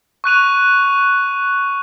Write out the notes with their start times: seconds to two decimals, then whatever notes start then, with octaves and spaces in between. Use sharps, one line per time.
0.24 C#6 F#6 D#7 F7